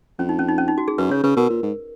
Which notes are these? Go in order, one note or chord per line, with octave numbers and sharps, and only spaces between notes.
F2 C#4
D#4
C#4
D#4
C#4
D#4
F#4
G#4
F#2 B4
C#3 C#5
C#3 B4
B2 A#4
A#2
G#2